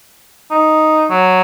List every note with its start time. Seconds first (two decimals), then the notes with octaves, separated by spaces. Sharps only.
0.51 D#4
1.10 F#3